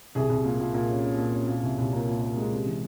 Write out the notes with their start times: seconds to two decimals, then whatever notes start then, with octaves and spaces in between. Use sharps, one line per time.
0.15 C2 G#4
0.29 C2
0.45 A#2
0.60 A#2
0.74 A#2
0.89 C#4
1.04 C#4
1.18 A#2
1.33 C#4
1.48 A#2
1.63 C2
1.78 C2
1.92 A#2 A#4
2.08 A#2
2.22 A#2
2.37 G#3
2.51 C3
2.66 E3